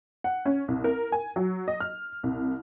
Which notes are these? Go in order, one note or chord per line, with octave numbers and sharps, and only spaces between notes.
F#5
C#4
C2
A#4
G#5
F#3
D#5
F6
C2